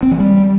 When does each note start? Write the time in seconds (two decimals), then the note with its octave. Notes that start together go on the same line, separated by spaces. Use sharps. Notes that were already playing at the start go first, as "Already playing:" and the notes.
0.03 C4
0.11 E3
0.20 G3